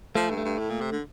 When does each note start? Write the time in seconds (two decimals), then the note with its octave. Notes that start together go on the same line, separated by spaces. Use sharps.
0.15 F3 A3
0.30 G2
0.37 A3
0.45 G2
0.59 A2
0.70 A#2
0.81 C3
0.92 D3